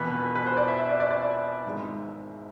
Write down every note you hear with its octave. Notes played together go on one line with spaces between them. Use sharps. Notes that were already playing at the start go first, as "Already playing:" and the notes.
Already playing: E1 E2 B2 B3 B4
B4
C5
D5
E5
E5
D5
D5
D5
E5
G#1 G#2 G#3